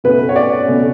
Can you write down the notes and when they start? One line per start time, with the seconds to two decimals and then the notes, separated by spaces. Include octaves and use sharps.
0.04 B2 A3 C#4 B4
0.29 C#5
0.36 D5
0.66 B2 A3 C#4